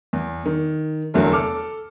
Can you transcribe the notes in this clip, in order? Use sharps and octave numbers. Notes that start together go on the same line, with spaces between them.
E2
D#3
F1 E2 D3 F#3 A3 A#4
A4 D6 F6